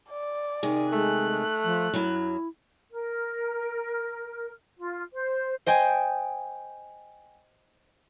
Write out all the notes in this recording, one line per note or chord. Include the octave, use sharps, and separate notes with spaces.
D5
C3 D#3 G#4
G#3 A3 F#6
F3
F#2 F#3 E4
A#4
F4
C5
C5 D#5 G5 G#5